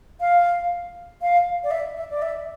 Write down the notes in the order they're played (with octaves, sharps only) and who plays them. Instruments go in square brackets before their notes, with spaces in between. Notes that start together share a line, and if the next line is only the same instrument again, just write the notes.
[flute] F5
F5
D5
E5
E5
D5
E5